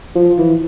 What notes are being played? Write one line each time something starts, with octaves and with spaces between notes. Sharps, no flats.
F3
E3